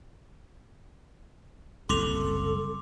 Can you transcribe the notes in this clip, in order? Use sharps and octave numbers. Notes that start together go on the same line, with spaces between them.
F#1 C2 A4 C6 D6 F7